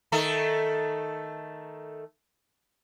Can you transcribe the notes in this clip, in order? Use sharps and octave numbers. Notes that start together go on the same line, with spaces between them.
D#3 A3 A4